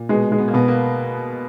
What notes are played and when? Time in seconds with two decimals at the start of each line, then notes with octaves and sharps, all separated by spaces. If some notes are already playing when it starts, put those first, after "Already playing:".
Already playing: A#2
0.09 B2 G#3
0.32 G#3
0.38 B3
0.48 A#3
0.54 B2 B3
0.68 A#3